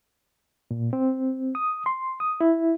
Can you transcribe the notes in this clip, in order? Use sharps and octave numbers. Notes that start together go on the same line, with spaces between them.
A#2
C4
D#6
C6
D#6
E4